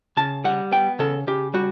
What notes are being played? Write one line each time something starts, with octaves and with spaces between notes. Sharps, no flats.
C#3 A5
G3 F#5
B3 G5
C#3 A4
C#3 G4
G3 F#4